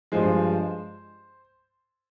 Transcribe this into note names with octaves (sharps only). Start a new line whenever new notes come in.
G2 F3 G#3 C5